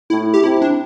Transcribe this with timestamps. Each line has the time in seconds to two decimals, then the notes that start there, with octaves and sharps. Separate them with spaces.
0.10 A2 E4
0.34 G4
0.44 C3 E4
0.62 D4